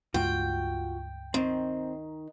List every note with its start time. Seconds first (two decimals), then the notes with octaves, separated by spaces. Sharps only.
0.14 C#2 G2 G#3 F4 F#4 G5
1.34 D#3 C4